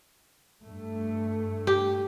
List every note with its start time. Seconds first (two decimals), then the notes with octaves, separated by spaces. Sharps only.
0.63 G2 A3
1.67 G4